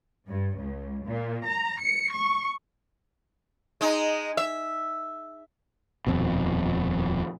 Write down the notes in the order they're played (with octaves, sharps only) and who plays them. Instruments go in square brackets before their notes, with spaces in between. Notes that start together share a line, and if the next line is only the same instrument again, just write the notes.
[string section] G2
C#2
A#2
A#5
C#7
C#6
[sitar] G#3 D#4
E5
[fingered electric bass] D#1 F2 B2